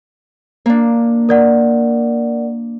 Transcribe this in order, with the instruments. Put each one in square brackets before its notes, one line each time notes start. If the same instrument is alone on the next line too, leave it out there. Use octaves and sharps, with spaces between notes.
[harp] A#3 D4
[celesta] A#4 D5 F#5